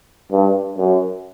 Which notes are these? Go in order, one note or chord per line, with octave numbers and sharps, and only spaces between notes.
G2
F#2